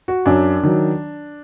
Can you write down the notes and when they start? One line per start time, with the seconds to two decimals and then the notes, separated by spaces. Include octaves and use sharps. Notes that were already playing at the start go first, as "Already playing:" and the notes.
0.08 F#4
0.26 F#2 F#3 D4
0.63 D#3 F#3